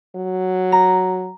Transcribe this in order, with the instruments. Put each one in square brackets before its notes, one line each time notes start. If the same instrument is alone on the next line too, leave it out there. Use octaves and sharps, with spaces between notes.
[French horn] F#3
[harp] A#5